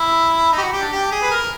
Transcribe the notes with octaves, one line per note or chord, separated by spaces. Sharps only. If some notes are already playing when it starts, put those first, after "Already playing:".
Already playing: E4
D#4
G4
F#4
G4
D4
G4
G#4
B4
A#4